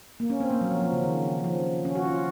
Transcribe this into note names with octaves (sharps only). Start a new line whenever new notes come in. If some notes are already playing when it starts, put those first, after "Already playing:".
A#3
C#4
C4
A#3
F#3
F3
F3
C#3
D#3
F3
C#4
F#4
F4